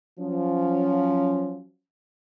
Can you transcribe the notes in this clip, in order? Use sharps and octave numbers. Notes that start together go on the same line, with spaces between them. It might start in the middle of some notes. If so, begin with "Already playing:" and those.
F3 F#3 C#4